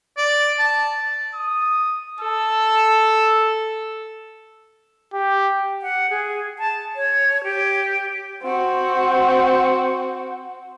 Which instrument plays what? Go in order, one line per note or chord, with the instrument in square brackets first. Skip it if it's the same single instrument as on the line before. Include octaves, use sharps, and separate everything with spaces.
[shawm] D5
A5
[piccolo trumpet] D#6
[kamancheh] A4 [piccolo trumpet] E6
[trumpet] G4
[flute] F#5
G#4
A5
C#5
G4
[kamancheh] C4 F#4